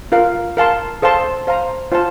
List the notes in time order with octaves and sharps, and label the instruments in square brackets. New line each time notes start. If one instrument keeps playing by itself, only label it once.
[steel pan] F4 A#4 F5
A#4 F5 A5 C6
A4 C5 F5 A5 C6
C5 F5 A#5
F4 C5 F5 A5